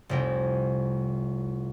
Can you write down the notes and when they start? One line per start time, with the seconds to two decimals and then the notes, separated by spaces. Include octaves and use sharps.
0.09 F1 C2 G5